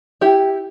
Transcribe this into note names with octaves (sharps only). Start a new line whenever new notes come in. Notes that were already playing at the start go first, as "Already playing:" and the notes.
E4 G4